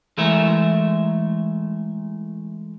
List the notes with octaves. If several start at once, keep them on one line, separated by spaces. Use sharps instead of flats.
E3 G#3 A3 A#4 E5